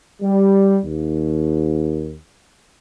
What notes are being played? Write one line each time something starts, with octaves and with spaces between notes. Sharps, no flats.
G3
D#2